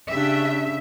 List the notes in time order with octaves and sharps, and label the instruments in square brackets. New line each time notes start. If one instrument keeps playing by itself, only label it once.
[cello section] C#3 E5 [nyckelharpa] D4 G4